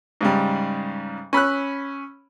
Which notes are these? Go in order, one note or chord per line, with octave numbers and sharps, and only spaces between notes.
G#2 C#3 G3
C#4 B5 E6 F#6